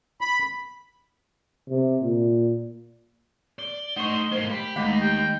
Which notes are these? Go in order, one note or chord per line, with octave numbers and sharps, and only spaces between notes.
B5
C3
A#2
D5 G7
A3 D#4 C5 C#6
G#2 A#3 C5
G4 B5
D#2 G#3 A3 D#4 D6
G4 G5